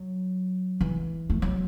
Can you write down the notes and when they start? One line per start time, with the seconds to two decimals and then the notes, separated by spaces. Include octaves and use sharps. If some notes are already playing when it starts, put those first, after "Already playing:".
Already playing: F#3
0.81 E3
1.30 A3
1.42 F#3